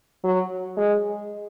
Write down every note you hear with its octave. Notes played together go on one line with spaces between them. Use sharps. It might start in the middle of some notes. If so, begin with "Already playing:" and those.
F#3
G#3